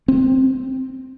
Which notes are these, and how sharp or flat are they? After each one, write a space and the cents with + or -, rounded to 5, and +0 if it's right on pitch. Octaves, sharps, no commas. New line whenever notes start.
C4 +0